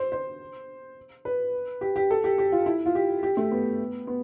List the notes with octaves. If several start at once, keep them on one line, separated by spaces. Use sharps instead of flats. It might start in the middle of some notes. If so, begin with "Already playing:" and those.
Already playing: C5
C5
B4
G4
G4
A4
G4
G4
F4
E4
F4
G4
G4
A3
B3
B3